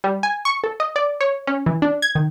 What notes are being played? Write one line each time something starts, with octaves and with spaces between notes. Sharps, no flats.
G3
G#5
C#6
A4
D#5
D5
C#5
C#4
E3
D4
G#6
D#3